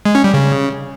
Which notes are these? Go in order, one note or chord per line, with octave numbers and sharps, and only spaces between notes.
G#3
C#4
G3
C#3